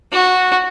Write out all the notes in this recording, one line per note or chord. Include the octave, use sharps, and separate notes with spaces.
F#4